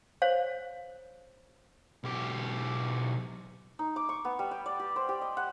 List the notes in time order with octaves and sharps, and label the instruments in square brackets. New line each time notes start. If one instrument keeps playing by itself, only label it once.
[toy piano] C5 C#5 F5
[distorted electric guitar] B1 G4
[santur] D#4
D6
C#6
B3
G3
G5
D5
G4
C5
G4
D#5
F#5